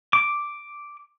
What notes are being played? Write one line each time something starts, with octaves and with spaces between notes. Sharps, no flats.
D6